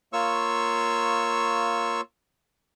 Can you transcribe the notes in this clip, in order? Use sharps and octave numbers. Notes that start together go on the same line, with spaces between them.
A#3 F4 C#5 C#6 E6